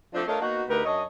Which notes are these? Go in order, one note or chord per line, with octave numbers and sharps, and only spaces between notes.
F3 A3 C4 D4
A3 D4 F4 A#4 C#5 D#5
A#3 B3 D#4 F#4
D2 D#4 G4 A#4 B4
F#2 D4 C#5 D#5